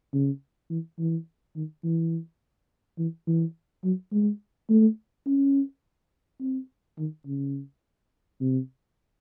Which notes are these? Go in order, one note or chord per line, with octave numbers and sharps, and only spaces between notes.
C#3
E3
E3
D#3
E3
E3
E3
F#3
G#3
A3
C#4
C4
D#3
C#3
C3